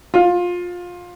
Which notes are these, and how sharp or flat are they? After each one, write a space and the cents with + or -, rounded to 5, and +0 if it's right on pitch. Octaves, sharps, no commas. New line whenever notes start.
F4 +20